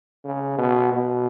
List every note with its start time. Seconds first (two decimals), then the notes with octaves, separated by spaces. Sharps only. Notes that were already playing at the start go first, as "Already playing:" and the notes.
0.24 C#3
0.58 B2
0.93 B2